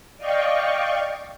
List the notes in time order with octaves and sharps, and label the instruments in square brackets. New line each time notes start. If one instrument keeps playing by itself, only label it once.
[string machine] D5 D#5 F5 G5 C#6